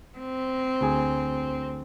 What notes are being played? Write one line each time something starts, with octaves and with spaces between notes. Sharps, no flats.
C4
D2 G#4